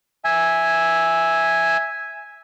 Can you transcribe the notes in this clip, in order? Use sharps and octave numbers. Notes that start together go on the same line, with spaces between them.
E5 G#5